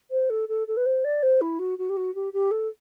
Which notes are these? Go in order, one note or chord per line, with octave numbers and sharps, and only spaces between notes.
C5
A4
A4
A4
B4
C5
D5
C5
E4
F#4
F#4
G4
F#4
G4
G4
A4